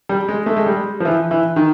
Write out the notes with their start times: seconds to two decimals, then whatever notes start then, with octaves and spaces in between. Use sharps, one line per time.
0.09 G3
0.28 G#3
0.46 A3
0.57 G#3
0.66 G3
1.00 F3
1.05 E3
1.31 E3
1.56 D#3